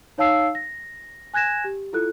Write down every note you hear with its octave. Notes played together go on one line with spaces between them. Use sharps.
D#4 C#5 F5 A5 E6 C7
A#6
G#5 F#6 G#6 A#6 E7
G4
E4 F4 A4 F#6